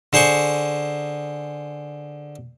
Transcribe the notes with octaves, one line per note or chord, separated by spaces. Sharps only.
D3 G#4 C5 C6 C#6